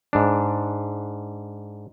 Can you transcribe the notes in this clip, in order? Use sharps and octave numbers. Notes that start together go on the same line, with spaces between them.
G#2 D4